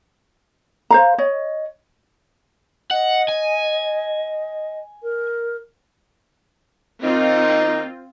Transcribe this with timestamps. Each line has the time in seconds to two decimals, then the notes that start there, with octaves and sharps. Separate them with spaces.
0.90 C5 F5 A#5
1.18 C#5 D#5
2.91 D#5 F#5
3.28 G#5
5.03 A#4
7.02 D#3 A#3 C4 D#4 F4